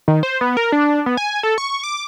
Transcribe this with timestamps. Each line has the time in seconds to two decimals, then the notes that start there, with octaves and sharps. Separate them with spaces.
0.08 D#3
0.23 C5
0.41 B3
0.57 A#4
0.72 D4
1.06 B3
1.17 G#5
1.43 A4
1.58 C#6
1.83 D6